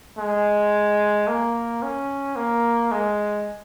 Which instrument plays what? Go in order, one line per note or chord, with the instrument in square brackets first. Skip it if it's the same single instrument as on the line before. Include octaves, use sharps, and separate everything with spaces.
[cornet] G#3
A#3
C#4
A#3
G#3